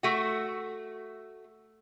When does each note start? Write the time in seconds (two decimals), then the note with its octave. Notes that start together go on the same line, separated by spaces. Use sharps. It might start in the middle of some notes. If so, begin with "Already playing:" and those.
0.03 A3 F#4